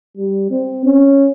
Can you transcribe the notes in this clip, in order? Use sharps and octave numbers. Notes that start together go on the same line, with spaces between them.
G3
C4
C#4